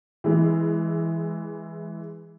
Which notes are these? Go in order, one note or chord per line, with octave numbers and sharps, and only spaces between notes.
E3 G#3